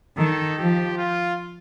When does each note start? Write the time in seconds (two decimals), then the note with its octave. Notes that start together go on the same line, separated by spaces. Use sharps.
0.17 D#3 A4
0.58 F3 G4
0.98 F4